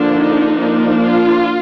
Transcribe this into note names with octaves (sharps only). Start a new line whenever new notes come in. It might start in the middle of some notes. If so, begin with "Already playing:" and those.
Already playing: D3 F3 A#3 D4
D#4
F3 A#3 D4
F4